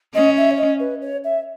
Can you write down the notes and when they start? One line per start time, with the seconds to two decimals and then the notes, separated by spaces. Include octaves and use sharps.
0.15 C#4 D#5
0.37 E5
0.51 C#5
0.58 D#5
0.80 B4
1.02 C#5
1.24 E5